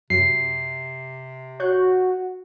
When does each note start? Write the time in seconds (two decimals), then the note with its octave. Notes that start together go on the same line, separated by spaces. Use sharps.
0.10 F#2 C3 C7
1.60 F#4 C#5 F#6 G6